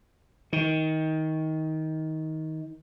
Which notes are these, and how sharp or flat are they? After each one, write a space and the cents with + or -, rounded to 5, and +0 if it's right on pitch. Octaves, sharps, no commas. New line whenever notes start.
D#3 +20